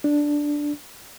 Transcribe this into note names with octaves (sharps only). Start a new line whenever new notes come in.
D4